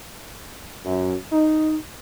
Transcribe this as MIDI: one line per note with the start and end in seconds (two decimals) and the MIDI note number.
0.85 1.14 42
1.32 1.76 63